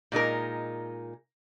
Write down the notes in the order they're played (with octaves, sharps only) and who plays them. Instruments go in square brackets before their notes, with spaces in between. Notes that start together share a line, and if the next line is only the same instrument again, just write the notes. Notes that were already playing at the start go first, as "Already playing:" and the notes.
[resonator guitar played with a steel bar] A#2 G#3 D#4 A#4